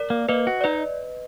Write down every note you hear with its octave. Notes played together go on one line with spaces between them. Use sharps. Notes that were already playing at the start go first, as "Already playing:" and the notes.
Already playing: A#4 D5
A#3
A#3 B4 D#5
F#4
D5
D#4 B4 D#5